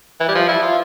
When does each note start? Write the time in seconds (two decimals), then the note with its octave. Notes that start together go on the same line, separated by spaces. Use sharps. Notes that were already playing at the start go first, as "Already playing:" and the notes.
0.20 E3
0.28 G3
0.35 F3
0.49 E4
0.63 F4